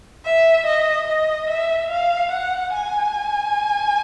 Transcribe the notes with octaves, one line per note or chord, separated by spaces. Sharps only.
E5
D#5
D#5
E5
F5
F#5
G#5